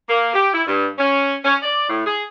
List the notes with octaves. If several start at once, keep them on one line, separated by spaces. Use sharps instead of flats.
A#3
G4
E4
G2
C#4
C#4
D5
A2
G#4